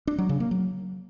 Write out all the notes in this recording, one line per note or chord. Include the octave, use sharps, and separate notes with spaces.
D4
F#3
C#3
A#3
F#3